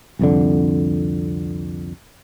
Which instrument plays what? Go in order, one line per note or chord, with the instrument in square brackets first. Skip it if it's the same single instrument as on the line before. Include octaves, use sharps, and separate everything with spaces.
[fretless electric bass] C2 F2 D3